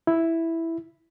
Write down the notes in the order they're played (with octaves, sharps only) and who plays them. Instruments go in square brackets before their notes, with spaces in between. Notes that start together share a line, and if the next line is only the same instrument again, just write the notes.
[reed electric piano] E4